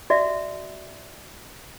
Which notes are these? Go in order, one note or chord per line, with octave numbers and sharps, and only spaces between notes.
F#4 D5 E5